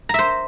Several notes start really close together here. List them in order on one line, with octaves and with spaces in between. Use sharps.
A#5 E5 C5